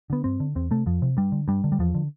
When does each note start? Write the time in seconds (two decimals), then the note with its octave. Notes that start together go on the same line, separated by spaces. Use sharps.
0.10 D3 B3
0.24 G2 C4
0.40 D3
0.55 E2 C4
0.71 C3 A3
0.86 F2 F3
1.02 C3
1.17 G2 G3
1.32 D3
1.48 G2 G3
1.64 D3
1.72 G3
1.79 E2 F3
1.95 D3